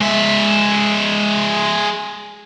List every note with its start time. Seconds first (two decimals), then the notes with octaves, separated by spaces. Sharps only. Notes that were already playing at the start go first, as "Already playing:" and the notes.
0.01 G#3 E5